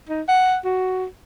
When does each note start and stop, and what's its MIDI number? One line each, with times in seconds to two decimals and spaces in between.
0.09 0.22 63
0.28 0.57 78
0.65 1.05 66